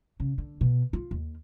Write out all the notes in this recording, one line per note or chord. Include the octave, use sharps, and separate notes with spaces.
C#3
D3
B2
F4
D#2